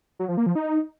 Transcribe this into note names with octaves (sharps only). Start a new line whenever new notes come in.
F#3
F3
A#3
F3
D#4